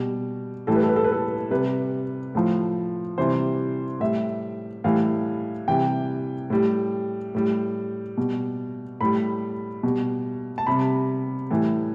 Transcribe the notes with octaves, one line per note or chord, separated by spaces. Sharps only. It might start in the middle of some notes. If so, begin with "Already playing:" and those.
Already playing: B2 G3
A2 E3 G3 A4
B4
A4
B4
A4
B4
A4
C3 G3 B4
A2 F3
C3 E3 G3 C5
A2 G3 E5
A2 E3 G3 F5
C3 E3 G3 G5
A2 G3
A2 G3
B2 G3
A2 G3 B5
B2 G3
A5
C3 G3 B5
A2 E3 G3